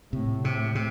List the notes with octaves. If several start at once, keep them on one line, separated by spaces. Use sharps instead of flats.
A2 C3
C3
C3